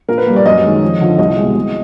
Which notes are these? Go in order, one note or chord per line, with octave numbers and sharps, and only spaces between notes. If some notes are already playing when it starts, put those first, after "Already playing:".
A#2 A#4
B4
G3 A#3
D5
F#2 D#5
D#3 G#3
F2
D3 F3
C2 D#5
B2 G#3
C2